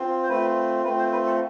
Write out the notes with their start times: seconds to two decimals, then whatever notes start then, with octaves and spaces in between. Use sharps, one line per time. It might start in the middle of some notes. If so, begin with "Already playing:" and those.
Already playing: C4 F4
0.23 C5
0.29 A3 C4 F4 B4
0.84 A3 C4 F4 B4
0.98 C5
1.12 B4
1.26 A4